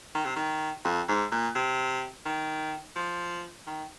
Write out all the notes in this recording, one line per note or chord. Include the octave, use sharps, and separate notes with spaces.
D#3
C3
D#3
F2
G#2
A#2
C3
D#3
F3
D#3